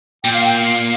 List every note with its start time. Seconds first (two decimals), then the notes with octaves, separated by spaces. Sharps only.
0.24 A#2 G5
0.34 F5
0.44 G5
0.58 F5